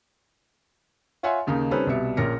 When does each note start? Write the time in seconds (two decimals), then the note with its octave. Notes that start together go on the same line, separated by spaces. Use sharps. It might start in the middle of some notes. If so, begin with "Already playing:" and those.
1.23 F4 C#5 E5 F#5 G#5 C6
1.47 D#2 C#3 A#3 D#4
1.71 G3 C4 C#4 D#4 A4 B4
1.87 C2 B2 G3 E5 C#7
2.17 A#1 A#2 C#4 A#4 A#6 C#7